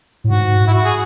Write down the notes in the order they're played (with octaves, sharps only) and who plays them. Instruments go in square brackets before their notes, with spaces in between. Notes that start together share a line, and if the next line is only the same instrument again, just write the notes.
[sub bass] A2
[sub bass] G#2 [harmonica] F#4
[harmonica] E4
F#4
G#4